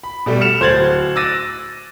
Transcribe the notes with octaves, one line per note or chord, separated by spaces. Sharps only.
B5
B2 G3 A3
F6 C#7 E7 F7
D1 C5 C6 G#6 A6 F#7
D6 E6 F#6 A6 A#6 D#7